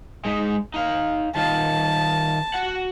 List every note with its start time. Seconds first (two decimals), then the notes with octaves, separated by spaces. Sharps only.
0.25 G#3 D#4
0.74 D#4 F5
1.36 D#3 F4 A5
2.54 F#4 F#5